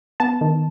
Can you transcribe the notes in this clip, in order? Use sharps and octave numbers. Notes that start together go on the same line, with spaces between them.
B3 A5
D#3